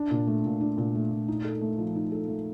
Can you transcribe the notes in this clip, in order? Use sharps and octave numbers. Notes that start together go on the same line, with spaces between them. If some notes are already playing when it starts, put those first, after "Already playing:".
Already playing: D4
A#2
A3
A#2
D4
A#2
A3
A#2
D#4
A4
A3
F3
D#4
A4
A3